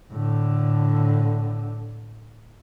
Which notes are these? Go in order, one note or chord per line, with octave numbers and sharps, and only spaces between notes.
A2 D3